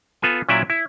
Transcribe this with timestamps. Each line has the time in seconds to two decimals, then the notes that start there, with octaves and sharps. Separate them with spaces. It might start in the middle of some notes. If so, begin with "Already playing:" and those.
0.22 B3 F4 A4 G#5
0.49 A#2 F#3 C#4 E4 D5 E5
0.70 E4